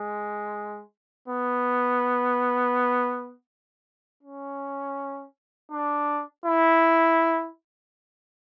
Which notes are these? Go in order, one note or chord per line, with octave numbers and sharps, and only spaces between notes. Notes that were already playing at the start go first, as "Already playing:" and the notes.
Already playing: G#3
B3
C#4
D4
E4